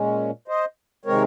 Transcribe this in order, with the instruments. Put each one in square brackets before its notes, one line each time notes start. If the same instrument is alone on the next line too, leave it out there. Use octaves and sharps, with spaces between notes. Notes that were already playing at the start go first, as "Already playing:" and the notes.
Already playing: [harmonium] A#2 G#3 C#4
C5 D#5
C3 D#3 G#3 C4 A#4 C#5